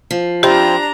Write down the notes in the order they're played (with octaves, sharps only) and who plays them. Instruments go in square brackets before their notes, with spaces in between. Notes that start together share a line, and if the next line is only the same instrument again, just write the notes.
[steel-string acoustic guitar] F3
[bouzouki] C4 E4 F4 [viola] D4 A#5 [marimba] G4